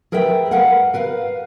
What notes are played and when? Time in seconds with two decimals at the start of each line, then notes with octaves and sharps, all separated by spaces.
0.12 G#4 A#4 B4 E5 G5
0.51 A#4 B4 F5 F#5
0.94 A#4 B4 F5